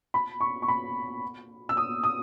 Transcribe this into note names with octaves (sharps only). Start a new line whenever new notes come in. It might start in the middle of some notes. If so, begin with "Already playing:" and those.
B5
C#6
C#6
B5
E6
D#6
D#6